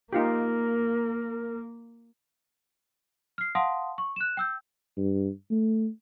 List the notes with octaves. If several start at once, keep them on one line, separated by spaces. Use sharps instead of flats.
A#3 D#4 F4 G4 A#4
F6 C7
F5 F#5 A5 C6 D#6
C#6
F#6 E7
G5 E6 G6
G2
A3